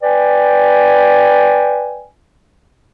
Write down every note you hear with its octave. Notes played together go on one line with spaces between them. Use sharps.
B4 D5 G5 G#5